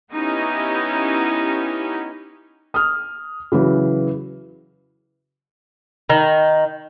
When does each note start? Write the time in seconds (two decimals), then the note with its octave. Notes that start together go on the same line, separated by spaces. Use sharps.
0.14 B3 C#4 D#4 E4 G4
2.74 D#6 F6
3.52 C#3 E3 F#3
6.10 D#3